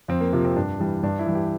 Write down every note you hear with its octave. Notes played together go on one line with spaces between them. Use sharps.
F2 C4
A#3
C3 F3 A#3
C4
G2 D4
E3 G3
G2 D4
E4
E3 G3
G4